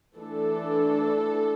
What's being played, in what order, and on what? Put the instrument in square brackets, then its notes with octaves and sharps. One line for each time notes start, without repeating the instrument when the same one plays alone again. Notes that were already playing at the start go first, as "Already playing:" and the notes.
[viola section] E3 A3 D4 A4